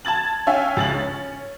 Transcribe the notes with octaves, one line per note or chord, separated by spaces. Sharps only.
A5 G#6 A6 F#7
C#4 E5 F5 G5 G#5
C#2 A6 F#7
C#4